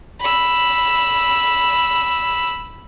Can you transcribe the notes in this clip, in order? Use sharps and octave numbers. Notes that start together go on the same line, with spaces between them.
B5 E6